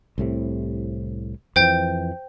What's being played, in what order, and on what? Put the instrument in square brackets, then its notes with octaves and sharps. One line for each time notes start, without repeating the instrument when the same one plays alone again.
[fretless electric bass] C2 A2 C3
[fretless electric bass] F2 E3 [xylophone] C5 G5 G6